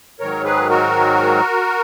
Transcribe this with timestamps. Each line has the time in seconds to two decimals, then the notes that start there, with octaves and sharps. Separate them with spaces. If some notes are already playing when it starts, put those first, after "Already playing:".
0.20 G#2 D#3 F#3 A#4 C#5
0.44 G#4 B4
0.70 F#4 A#4